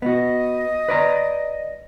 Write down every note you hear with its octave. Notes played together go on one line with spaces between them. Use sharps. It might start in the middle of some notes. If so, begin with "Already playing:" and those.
B3 F#4 D#5
B4 D5 A#5